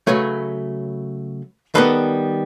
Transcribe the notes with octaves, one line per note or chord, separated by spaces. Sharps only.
C#3 F#3 A3 B4 C#5
D#3 G3 B3 A4 B4